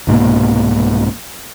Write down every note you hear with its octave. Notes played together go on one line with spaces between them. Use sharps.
C2 G#2 B2 A#3